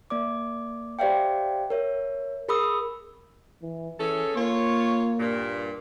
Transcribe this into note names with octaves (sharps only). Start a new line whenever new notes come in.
A#3 D5 D6
G4 C5 D5 E5 F5 G5
A#4 C#5 E5
G#4 A#4 B5 C#6 D#6 E6
E3
E3 C#4 G#4 A4
A#3 F4 C#5
G2 A#2